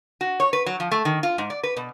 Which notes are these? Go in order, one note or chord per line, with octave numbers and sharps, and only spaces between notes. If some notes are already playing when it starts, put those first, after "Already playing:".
F#4
C#5
B4
F#3
F3
A3
D#3
F4
G#2
D5
B4
B2